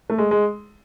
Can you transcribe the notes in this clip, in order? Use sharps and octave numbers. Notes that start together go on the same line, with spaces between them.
A3
G#3
G#3